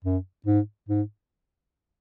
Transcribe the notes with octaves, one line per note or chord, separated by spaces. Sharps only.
F#2
G#2
G#2